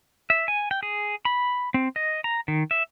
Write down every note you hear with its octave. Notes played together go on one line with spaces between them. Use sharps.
E5
G#5
G5
G#4
B5
C4
D#5
A#5
D#3
E5